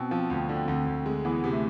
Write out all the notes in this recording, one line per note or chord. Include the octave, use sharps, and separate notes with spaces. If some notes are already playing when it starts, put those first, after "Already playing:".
Already playing: B2 C4
F3
D2
D3
D2
D2
G#3
E3 B3
C3
A3